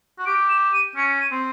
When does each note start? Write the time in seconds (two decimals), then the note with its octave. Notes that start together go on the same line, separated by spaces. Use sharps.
0.18 F#4
0.26 G4 D7
0.49 E7
0.73 D#7
0.96 C#4 C#7
1.20 D#7
1.31 C4